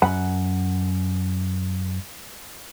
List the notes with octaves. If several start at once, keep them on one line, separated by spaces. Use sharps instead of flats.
F#2 F#5 B5